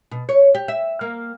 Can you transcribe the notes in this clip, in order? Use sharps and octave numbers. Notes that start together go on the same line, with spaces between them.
B2
C#5
G4
E5
A#3